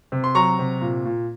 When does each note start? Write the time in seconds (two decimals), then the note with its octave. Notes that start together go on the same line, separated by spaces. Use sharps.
0.12 C3
0.24 C6
0.35 F#3 A#5 C#6
0.59 C3
0.81 A#2
1.05 A#2